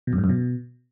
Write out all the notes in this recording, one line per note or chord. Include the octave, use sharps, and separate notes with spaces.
B2
F#2
G#2
F#2
B2